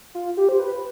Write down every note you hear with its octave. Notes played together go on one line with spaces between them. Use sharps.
F4
G4
C5
B4